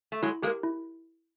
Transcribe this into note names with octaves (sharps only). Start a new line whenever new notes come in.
A3
F#3 G#3 E4
G#3 A#3 G4 A#4
E4